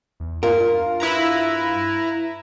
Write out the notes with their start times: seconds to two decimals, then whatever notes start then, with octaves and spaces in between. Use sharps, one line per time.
0.20 E2
0.43 G2 F4 A#4
1.00 E4 B4 A#5